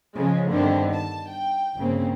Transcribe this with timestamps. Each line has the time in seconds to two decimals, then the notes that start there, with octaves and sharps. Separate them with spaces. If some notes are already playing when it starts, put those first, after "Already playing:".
0.16 C#3 F3 G#3
0.51 G2 D3 D#3 B3 C4
0.93 A5
1.30 G5
1.78 G1 C#3 A#3 C4